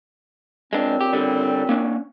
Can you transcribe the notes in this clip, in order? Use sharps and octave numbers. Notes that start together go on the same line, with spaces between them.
A#2 C#3 G#3 C4 D4
G4
D3 G3
A#3 C#4 D4